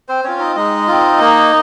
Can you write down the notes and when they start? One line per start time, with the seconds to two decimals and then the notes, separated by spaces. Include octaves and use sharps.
0.08 C4 C5
0.24 C4 C#4 F4 C#5
0.39 D#4 D#5
0.56 G#3 D#4 D#5
0.87 C4 F4
1.20 A#3